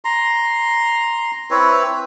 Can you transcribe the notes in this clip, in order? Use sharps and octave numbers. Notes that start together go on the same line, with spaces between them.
A#5 C6
C4 E4 B4 C#5